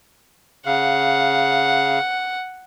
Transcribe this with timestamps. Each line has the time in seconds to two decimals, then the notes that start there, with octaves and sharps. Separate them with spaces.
0.66 C#3 F5 F#5